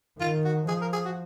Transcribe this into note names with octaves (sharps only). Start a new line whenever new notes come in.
D#3 F4
F#4
F3 G#4
A#4
G#4
F#4